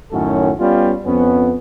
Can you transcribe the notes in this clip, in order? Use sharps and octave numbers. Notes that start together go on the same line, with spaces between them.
F#2 A2 D#3 C#4 F#4 A4
G3 B3 C#4 F4
F2 B3 C#4